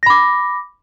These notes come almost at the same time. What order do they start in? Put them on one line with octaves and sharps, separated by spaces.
A#6 B5 D6